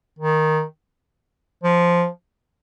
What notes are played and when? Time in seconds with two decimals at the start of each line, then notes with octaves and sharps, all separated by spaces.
0.19 D#3
1.63 F3